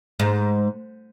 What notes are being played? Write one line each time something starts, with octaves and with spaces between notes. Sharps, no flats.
G#2